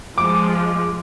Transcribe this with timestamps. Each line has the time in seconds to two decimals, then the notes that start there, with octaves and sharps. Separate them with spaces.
0.18 F3 G#3 D6